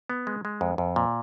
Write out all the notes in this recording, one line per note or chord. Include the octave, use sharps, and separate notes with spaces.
B3
G#3
G#3
F2
F2
A#2